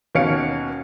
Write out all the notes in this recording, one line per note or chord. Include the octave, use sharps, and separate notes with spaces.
D#2 B2 C#4 C#5 F5 C#7